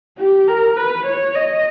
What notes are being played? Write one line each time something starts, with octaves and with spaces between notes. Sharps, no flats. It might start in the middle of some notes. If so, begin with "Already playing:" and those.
G4
A#4
B4
C#5
D#5